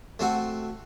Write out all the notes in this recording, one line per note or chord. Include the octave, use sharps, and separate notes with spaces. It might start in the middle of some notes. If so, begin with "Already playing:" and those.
A3 C4 F#4